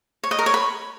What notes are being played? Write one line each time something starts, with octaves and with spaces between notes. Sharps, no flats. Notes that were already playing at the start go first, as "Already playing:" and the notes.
C#5
D#5
A#4
C#5
B5